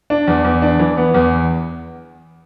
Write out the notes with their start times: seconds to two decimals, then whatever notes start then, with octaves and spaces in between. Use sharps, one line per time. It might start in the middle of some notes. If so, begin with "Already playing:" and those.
0.10 D4
0.28 E2
0.45 E2
0.62 D4
0.79 E3
0.97 B3
1.14 E2